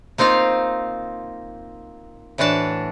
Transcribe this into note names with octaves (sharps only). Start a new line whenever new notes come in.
A#3 C4 D#4 F4 F5
A2 E3 D4 F#4 A5